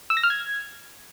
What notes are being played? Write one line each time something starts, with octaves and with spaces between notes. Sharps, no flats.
E6
A#6
F6
G#6